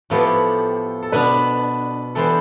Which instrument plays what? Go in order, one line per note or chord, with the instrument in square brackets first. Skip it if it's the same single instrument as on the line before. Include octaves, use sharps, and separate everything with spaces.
[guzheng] A2 F3 B3 E4 G4 [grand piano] A4
[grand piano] A4
[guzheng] B2 B3 D4 [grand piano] B4
[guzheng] E3 B3 D4 G4 C5 [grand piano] A4